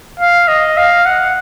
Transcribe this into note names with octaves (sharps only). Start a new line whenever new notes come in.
F5
D#5
F5
F#5